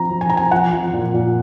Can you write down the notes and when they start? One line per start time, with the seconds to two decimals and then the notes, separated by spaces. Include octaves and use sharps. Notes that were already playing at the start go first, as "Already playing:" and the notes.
Already playing: F3 C4 A#5
0.11 F3
0.21 G#5
0.29 C4 A#5
0.37 G#5
0.51 F3 F#5
0.73 F3
0.93 A#2
1.14 A#2